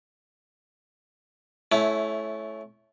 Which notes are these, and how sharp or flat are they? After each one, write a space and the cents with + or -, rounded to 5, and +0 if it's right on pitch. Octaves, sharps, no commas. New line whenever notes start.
A3 -20 C#4 +0 E4 +0